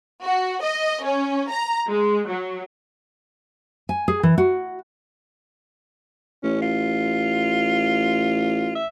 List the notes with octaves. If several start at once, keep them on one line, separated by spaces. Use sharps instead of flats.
F#4
D#5
C#4
A#5
G#3
F#3
G#5
G#4
E3
F#4
A1 C#4
F4
E5